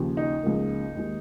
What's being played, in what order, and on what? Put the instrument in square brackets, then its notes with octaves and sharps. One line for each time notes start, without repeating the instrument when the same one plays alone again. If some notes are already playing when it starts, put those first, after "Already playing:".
Already playing: [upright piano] D#2 C#3 F3
D#4
C#2 C#3 F3 A#3
D#2 D#3 G#3